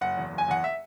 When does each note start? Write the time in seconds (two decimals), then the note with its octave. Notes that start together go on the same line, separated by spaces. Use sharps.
0.01 F#1 F#5
0.17 E2
0.33 F#1
0.38 G#5
0.48 E2 F#5
0.64 E5